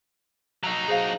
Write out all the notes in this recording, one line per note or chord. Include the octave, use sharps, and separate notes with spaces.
F#3 D#4 E6 B6
G#4 C5 F5